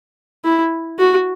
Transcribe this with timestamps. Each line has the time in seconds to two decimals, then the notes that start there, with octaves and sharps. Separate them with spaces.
0.44 E4
0.99 F#4